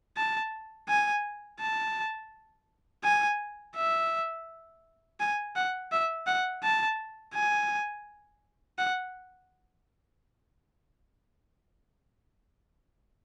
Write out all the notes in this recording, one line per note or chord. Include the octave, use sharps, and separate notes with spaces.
A5
G#5
A5
G#5
E5
G#5
F#5
E5
F#5
A5
G#5
F#5